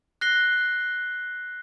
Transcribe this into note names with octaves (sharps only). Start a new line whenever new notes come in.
F#6 A#6 C7 G7